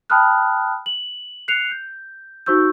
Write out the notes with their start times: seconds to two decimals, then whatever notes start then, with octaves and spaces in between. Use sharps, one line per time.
0.10 G5 A5 B5 D#6 F6 F#6
0.86 F#7
1.48 F#6 C7 C#7 F7
1.72 G6
2.46 D#4 F#4 C5 C#6 E6 G6